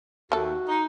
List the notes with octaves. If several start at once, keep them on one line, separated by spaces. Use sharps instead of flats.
D#2 A3 F#4 A4
D#4